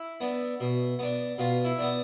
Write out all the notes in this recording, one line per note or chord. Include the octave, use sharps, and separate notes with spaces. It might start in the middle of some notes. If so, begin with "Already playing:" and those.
Already playing: E4
B3 D4
B2
B3 D4
B2 F4
E4
B3 D4